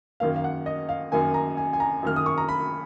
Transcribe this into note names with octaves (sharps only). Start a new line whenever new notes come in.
F#2 D#3 A#3 F5
F5
F#5
D#5
F5
F#2 D#3 A#3 G#5
A#5
G#5
G#5
A#5
F#2 D#3 A#3 F6
D#6
C#6
A#5
B5